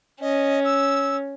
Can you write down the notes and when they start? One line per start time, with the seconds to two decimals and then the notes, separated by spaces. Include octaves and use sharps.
0.21 C#4 D#5
0.64 E6